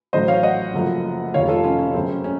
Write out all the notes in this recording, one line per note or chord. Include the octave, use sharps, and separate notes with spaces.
A1 A2 F#3 C5 D#5
C#5 F5
D#5 F#5
F#1 F#2 F3 A3
F1 F2 C3 D#3 C#5 F5
F4 A4
C#4 F4
C#4
F#1 F#2 C#3 C4
C#4
C#4